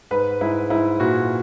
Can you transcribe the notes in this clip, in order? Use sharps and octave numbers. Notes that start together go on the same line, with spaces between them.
G#2 B4
G#2 E4
G#2 E4
A#2 F#4